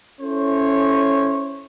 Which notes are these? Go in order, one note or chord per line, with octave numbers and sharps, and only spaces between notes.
C#4 E4 A4 C5 C#5